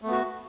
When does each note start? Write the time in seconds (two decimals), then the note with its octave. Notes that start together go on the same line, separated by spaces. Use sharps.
0.02 A3
0.07 B3
0.12 F#4